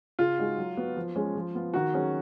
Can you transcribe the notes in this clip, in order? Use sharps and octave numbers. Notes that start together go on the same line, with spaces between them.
C#3 F4
G#3 D#4 F#4
F#3
B3 F#4 B4
F3
G#3 C#4
F3
B3 F4
D#3 F#4
F#3 C#4 G#4